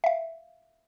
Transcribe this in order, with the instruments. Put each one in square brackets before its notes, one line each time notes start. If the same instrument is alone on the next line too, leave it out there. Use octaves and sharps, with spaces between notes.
[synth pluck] E5 F5